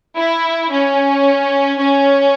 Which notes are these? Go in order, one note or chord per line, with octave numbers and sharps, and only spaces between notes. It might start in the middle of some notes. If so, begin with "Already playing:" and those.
E4
C#4
C#4